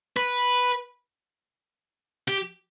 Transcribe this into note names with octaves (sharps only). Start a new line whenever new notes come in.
B4
G4